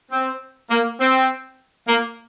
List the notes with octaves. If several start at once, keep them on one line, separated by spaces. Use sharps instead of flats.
C4
A#3
C4
A#3